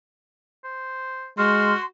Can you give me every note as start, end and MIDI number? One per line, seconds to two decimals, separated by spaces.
0.64 1.28 72
1.38 1.74 56
1.38 1.83 66
1.38 1.83 84
1.38 1.74 89